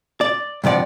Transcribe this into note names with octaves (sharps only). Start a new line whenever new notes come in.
D5
G2 C3 F3 D5 F#5